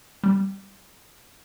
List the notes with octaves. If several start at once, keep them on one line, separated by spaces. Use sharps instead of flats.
G3